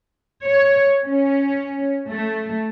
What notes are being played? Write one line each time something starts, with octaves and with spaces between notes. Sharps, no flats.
C#5
C#4
A3